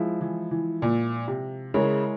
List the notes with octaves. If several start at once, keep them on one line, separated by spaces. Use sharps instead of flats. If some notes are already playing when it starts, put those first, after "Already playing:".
Already playing: F3 G#3 E4
E3
E3
A#2
C3
C#3 G#3 E4 A#4 C#5